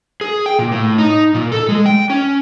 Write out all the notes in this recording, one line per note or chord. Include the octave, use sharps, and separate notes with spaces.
G#4
G5
A#2
A2
D#4
A#2
A4
G#3
G5
C#4